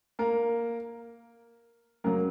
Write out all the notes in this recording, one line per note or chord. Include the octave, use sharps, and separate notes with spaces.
A#3 A#4
F#2 C#3 F#3 A#3 A#4